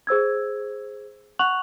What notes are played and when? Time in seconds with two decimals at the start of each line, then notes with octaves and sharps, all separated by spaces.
0.07 G#4 C5 E6 G#6
1.39 F#5 C#6 F#6 F7 F#7